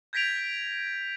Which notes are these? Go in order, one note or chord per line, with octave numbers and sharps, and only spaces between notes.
G6 G#6 A#6 B6 D7 F7